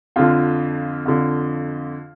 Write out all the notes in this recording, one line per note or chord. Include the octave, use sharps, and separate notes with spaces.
F2 D3 F3 F4
F2 D3 F3